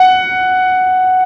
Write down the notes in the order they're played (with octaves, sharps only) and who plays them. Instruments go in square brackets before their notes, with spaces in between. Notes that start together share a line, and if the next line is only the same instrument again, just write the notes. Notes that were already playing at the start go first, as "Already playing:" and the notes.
Already playing: [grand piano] F#5